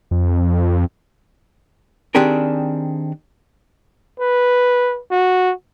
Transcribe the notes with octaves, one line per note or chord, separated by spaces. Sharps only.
F2
D#3 C4 D4 G4 G#4 A#4
B4
F#4